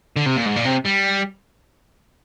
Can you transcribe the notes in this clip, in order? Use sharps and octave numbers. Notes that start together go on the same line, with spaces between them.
D3
C3
A#2
G#2
A#2
C3
G3